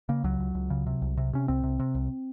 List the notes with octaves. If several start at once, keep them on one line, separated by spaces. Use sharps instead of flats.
C#3 A#3
C#2 F#3
C#2
C#2
C#3
C3
C2
C3
C3 C#4
C2 C4
C3
C3
C2